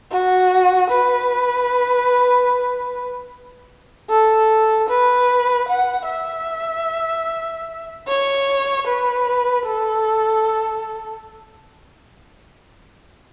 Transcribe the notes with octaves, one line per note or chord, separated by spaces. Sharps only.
F#4
B4
A4
B4
F#5
E5
C#5
B4
A4